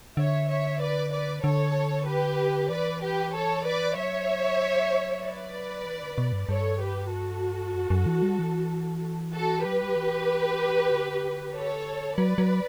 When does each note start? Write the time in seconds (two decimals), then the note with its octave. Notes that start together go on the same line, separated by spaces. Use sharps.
0.17 D3 C#5 E5
0.49 C#5 E5
0.80 B4 D5
1.12 B4 D5
1.43 D3 A4 C#5
2.06 G4 B4
2.69 E3 B4 D5
3.01 G4 B4
3.33 A4 C#5
3.64 B4 D5
3.96 F#3 C#5 E5
5.22 B4 D5
5.86 E3
6.02 D3
6.18 B2
6.33 G2
6.49 G2 A4 C#5
6.80 G4 B4
7.11 F#4 A4
7.75 F#2
7.90 F#2
8.06 E3
8.22 G3
8.39 E3
9.33 F#4 A4
9.64 F#3 G4 B4
9.82 G3
9.89 F#3
9.96 E3
10.91 D3
11.54 A4 C#5
12.17 F#3 B4 D5
12.38 F#3